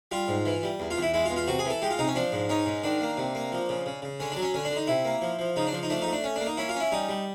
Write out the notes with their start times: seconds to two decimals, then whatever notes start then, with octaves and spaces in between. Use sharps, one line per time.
0.11 G3 F4
0.28 G#2
0.46 E3
0.63 G3
0.80 E2
0.91 F4
0.97 E2
1.02 E4
1.14 G#3 E4
1.25 F4
1.30 E2
1.36 F4
1.47 C3 F#4
1.59 G#4
1.65 E3
1.70 A4
1.82 G#3 G4
1.91 F4
1.98 C3 D#4
2.07 C#4
2.15 F3 D4
2.32 G#2
2.49 C#4 D#4
2.66 G#2
2.83 D#3 D4
3.01 A#3
3.17 C3
3.35 A#3
3.52 F3
3.69 C#3
3.86 C#3
4.02 C#3
4.20 D3 C#4
4.32 F#3 D4
4.42 C#4
4.54 D3 C#4
4.65 D4
4.71 D3
4.76 D#4
4.87 C3 E4
5.05 A#3
5.22 F3
5.39 F3
5.56 C#3 D#4
5.67 D4
5.73 F3
5.83 D#4
5.90 A3 D4
6.02 A3 D#4
6.13 D4
6.24 C#4
6.36 A#3 D4
6.47 D#4
6.57 C#4 E4
6.69 F4
6.75 C#4
6.80 E4
6.92 G3 D#4
7.09 G3